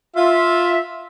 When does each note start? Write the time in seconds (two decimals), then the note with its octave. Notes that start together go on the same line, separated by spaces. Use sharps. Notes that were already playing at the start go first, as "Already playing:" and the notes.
0.16 F4 E5